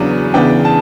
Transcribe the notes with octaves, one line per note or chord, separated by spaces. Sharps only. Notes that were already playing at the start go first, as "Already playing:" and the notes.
Already playing: E2 C#3 F#3 B3 D4
C#3 E3 B3 D4 G5
A5